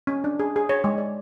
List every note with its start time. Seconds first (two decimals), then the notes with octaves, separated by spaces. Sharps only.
0.07 C#4
0.24 D4
0.40 G#4
0.56 G#4
0.69 C#5
0.84 G#3
0.98 D5